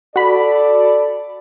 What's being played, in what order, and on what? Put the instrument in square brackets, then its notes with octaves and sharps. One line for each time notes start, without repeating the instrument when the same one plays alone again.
[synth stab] F#4 B5 [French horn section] A4 D5